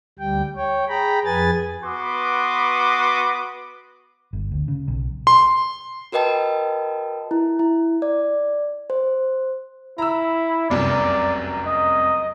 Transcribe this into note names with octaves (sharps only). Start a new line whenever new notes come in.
D2 G3 G5
C#5 G5
G#4 G5 A#5 B5
F2 G#4 B4 G#5 A6
B3 F#4 B4 C6 D6 D#6
G1
D2
C#3
B1
C6
F#4 A#4 B4 D#5 G5 A5
E4
E4
D5
C5
E4 A#5 E6
F1 C2 F#2 D5
D#5